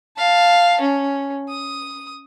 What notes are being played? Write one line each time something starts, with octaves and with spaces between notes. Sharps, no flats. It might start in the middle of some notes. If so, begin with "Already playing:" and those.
F5 A5
C#4
D#6